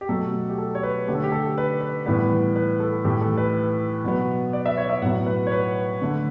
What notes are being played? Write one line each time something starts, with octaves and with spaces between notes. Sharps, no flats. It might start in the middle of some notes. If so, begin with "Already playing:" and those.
G4
B2 F#3 A3 A4
G4
A4
C#5
B4
D3 A3 G4
A4
G4
A4
B4
B4
A2 E3 G3 B3 B4
B4
A4
A2 E3 A3 G4
A4
B4
B2 F#3 B3
D5
E5
C#5
E5
A2 F#3 B3 F#5
B4
C#5
B4
D3 A3